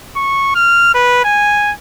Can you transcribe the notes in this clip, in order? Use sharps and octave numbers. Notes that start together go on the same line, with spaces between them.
C#6
F6
B4
G#5